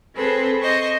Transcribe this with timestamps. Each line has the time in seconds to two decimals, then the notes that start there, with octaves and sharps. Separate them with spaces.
0.15 C4 G#4 A4 B4 C5
0.63 C5 D#5 C#6